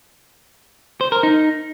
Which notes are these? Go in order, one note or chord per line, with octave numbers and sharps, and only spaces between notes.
C5
A#4
D#4